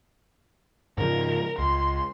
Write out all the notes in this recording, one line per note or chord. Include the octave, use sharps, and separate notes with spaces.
G#2 C#3 F3 A#4
C#2 C6